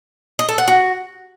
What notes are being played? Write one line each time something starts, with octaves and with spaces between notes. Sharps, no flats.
D#5
A4
F#5
F#4